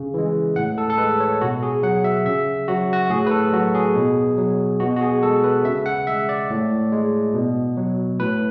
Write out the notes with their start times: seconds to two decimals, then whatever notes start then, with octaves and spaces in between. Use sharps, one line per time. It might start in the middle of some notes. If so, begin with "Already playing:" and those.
Already playing: C#3
0.14 E3 G#3
0.56 A2 F#5
0.78 A4
0.90 A4
0.98 G#3 B4
1.20 C#5
1.41 B2 F#4
1.63 G#4
1.83 F#3 F#5
2.04 E5
2.25 C#3 E5
2.68 F#3 F#4
2.93 F#4
3.10 A2 G#4
3.27 B4
3.31 A4
3.53 F#3 F#4
3.75 G#4
3.95 B2
4.38 F#3
4.80 B2 F#4
4.96 F#4
5.01 G#4
5.23 G#3 A4
5.44 B4
5.65 C#3 E5
5.86 F#5
6.07 G#3 E5
6.29 D5
6.50 A2
6.92 G#3
7.34 B2
7.77 F#3
8.20 A2 B4